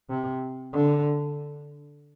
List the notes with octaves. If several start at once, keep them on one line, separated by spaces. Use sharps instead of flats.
C3
D3